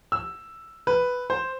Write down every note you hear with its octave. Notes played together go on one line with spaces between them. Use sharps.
E6
B4
C5